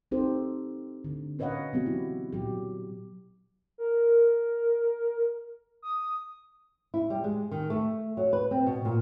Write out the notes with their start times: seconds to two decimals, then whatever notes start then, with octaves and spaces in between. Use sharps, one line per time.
0.11 C4 D#4 G4 A4 C5
1.04 D3
1.39 C#4 B4 C#5 D#5 F5 F#5
1.73 B2 F#3 B3 C4 F#4 G4
1.86 E4
2.33 A#2 F#3 G4
3.78 A#4
5.82 D#6
6.94 E4
7.10 G3
7.24 G#3
7.51 D#3
7.70 A3
8.17 F#3
8.33 B4
8.51 C4
8.66 B2
8.85 A#2